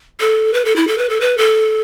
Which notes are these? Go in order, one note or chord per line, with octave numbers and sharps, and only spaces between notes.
A4
B4
A4
E4
A4
B4
A4
B4
A4